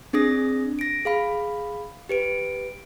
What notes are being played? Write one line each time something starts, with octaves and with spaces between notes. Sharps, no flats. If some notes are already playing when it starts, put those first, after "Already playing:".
C4 D4 G#4 D#6 A#6
A#6 D7
G#4 F5 B5
G4 B4 D7